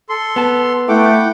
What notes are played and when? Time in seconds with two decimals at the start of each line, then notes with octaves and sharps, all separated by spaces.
0.09 A4 C6
0.36 B3 A5
0.89 A3 E4 F#5 G5 D6